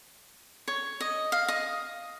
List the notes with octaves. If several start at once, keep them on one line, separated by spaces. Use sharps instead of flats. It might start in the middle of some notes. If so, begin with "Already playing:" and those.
C#5
D#5
F5
D#5